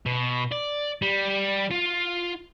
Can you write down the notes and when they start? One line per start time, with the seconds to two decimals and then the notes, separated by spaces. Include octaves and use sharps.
0.06 B2
0.52 D5
1.02 G3
1.71 F4